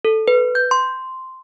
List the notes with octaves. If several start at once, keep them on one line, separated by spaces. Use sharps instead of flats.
A4
B4
G6
C6